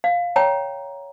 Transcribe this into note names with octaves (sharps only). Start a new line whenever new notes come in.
F5
C#5 G5 A#5